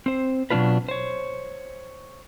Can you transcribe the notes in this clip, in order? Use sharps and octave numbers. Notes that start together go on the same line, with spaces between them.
C4 C5
B2 F#3 G#3 D4 F4 B4
C5 C#5